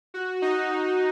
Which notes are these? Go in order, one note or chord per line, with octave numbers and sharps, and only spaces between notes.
F#4
D#4